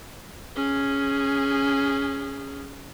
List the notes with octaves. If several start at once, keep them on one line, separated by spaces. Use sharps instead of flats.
C#4 G#4